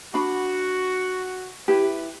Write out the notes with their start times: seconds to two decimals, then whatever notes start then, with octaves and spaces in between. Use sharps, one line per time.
0.14 D4 F#4 B5
1.68 E4 G4 B4